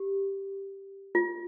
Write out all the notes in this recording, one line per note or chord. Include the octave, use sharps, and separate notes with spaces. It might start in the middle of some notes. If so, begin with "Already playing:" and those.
Already playing: G4
F4